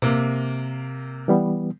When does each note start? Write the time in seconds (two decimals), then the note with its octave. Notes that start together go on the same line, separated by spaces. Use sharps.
0.02 C3 A#3
1.28 E3 G3 B3